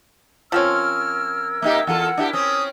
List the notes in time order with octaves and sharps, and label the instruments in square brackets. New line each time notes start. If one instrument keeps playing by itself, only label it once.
[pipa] F3 C4 C#4 [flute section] A#4 E6 G#6 [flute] F6
[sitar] A#3 D#4 G4 [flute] E5
[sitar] E2 F4 A4 [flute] F#5
[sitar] D4 E4 G4
[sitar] C4 C#4 [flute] D#6